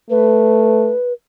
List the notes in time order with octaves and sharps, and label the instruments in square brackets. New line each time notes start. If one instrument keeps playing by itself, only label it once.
[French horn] A3 [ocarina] B4